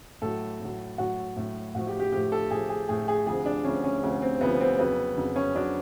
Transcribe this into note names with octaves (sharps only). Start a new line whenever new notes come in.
A2 F#3 A4
A2 F#3
A2 F#3 F#4
A2 F#3
A2 F3 F#4
G4
G4
A2 F3 G4
A4
A2 F3 G#4
G#4
A2 F3 G#4
G#4
D2 C3 F3 G#4
D4
D2 C3 F3 C#4
C#4
D2 C3 F3
C4
D2 C3 F3 B3
C4
F2 C#3 F#3 B3
F2 C#3 F#3
C#4
C#3 F#3 D4